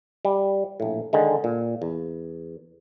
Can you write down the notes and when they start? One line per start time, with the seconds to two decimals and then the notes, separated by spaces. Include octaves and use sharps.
0.25 G3
0.80 A#1 A2
1.13 D3 D#3 G#3
1.44 A#2
1.82 E2